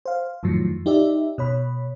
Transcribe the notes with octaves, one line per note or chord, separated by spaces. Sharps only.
C5 F5
F2 A2 D#3 F3 F#3
D#4 G4 D5 E5
B2 C#5 B5